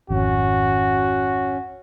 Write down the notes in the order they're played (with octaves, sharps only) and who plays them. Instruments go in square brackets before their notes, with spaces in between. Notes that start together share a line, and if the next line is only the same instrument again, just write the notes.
[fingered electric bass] G#1 F2 [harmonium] C#4 [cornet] F#4